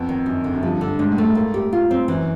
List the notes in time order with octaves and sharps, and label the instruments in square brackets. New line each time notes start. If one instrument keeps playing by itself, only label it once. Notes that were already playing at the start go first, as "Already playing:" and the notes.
Already playing: [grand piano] F2 [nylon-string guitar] B3
[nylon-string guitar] D#3
[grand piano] F#2 [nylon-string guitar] D#4
[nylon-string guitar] D3
[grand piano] F#2
[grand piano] G2 [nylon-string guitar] F3
[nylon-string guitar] D3
[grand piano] G#2 [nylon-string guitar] D4
[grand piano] A2
[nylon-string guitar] A3
[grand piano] G#2
[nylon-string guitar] A#3
G4
F4
C4
[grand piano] F#2 [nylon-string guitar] E3